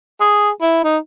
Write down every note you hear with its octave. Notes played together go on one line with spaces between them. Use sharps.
G#4
E4
D#4